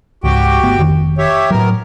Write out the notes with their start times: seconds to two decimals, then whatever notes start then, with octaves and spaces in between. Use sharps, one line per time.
0.24 C#2 G#2 F#4 G4 G5
0.63 G#1 A3 B3
0.78 F1 F2 D#3
1.18 G4 C#5 E5
1.51 A2 F#3 B3 A#4